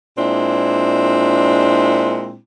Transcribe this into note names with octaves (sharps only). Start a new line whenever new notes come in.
A#2 G#3 C4 D4 E4